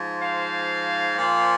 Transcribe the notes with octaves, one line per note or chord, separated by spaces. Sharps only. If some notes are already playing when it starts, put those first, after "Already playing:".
Already playing: G#2 F3
C5 F5
A#2 F3